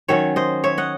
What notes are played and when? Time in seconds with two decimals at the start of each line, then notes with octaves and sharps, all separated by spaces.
0.08 D#3 F#3 C#4 C#5 E5
0.36 C5 D#5
0.64 C#5 E5
0.78 D#5 F#5